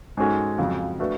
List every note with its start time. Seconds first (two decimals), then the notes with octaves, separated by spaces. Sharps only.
0.17 G#2 G#3 C#4 F#4 A4
0.58 F2 C#3 F#3
1.00 A3 D4 F#4 B4